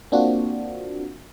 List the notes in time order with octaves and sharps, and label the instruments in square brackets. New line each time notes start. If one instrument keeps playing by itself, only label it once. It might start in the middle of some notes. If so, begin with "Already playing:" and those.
[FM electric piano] A#3 C4 D4 F4 F#4